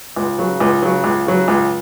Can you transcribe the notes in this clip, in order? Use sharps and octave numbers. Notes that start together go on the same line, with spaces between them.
C#2
C#3 F#3
C#2
C#3 F#3
C#2
C#3 F#3
C#2